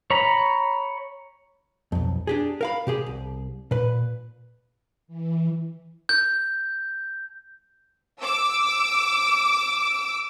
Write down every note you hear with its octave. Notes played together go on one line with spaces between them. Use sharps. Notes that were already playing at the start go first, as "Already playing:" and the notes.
C#5 A#5 B5
B1 F2
D4 G4 G#4
A#4 F5 B5
C3 G4 G#4
C2
A#2 B4
E3
G6
D6 E6